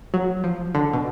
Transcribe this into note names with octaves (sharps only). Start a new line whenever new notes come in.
F#3
F3
D3
B2